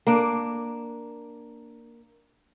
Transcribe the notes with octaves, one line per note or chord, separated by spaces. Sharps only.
A#3 D4